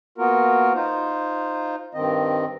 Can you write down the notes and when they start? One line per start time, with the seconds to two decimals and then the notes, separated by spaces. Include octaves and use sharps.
0.18 A#3 B3 F4 F#4 A#4
0.74 D#4 F4 C5
1.94 G2 D#3 C4 D#5